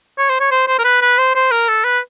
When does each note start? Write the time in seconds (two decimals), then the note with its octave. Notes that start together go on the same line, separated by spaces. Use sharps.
0.18 C#5
0.29 C5
0.40 C#5
0.51 C5
0.68 C5
0.78 A#4
0.84 B4
1.01 B4
1.18 C5
1.35 C5
1.51 A#4
1.68 A4
1.84 B4